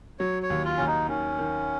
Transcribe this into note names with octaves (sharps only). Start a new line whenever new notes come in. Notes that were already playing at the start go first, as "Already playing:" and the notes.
F#3 C#5
C#5
D#2
F4
D#2 C#4
D#4
D#3 C#4
D#3